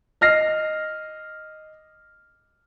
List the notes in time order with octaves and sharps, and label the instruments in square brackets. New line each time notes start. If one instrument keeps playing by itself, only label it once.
[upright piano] D#5 F6 A#6 C7